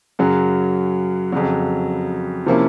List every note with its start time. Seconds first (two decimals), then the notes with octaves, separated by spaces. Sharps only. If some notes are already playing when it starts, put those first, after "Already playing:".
0.19 F#2 C#3 F#3
1.32 F2 C#3 F#3
2.46 C3 F3 A#3 C#4 E4